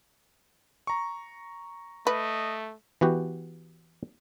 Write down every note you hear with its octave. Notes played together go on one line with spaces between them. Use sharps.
A#5 C#6
A3 B4 D#5
E3 B3 F#4 G4